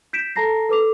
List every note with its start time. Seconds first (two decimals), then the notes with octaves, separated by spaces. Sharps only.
0.13 G6 B6 D7 E7
0.36 A4 A5 A#5 A#6 C7
0.69 A4 B4 D6 F7